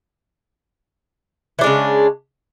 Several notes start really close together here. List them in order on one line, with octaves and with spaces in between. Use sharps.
E3 D4 G#3 C#3